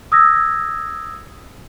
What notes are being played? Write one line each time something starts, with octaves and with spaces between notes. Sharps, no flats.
D#6 E6 G#6 A#6